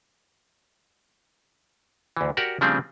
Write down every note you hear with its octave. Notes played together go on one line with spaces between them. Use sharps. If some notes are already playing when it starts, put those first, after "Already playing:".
D2 E3
F#4 G4 A#4 D5 F#5
C#3 F3 G3 A3 C4 D4